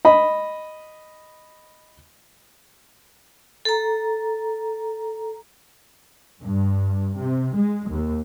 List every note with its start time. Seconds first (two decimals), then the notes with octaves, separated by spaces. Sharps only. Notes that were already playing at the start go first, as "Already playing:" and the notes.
0.05 D#5 B5
3.65 A4 A#5
6.42 G2
7.17 C3
7.54 G#3
7.90 D#2